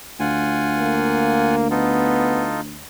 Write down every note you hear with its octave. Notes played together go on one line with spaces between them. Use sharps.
D2 F4 F#5 G#5
A#3
B3 D#4 F4 A4